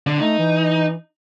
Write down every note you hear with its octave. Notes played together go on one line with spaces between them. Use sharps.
D3
A3 D#4
E3